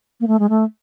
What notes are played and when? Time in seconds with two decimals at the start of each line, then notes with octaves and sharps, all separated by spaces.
0.21 A#3
0.28 A3
0.39 G#3
0.49 A3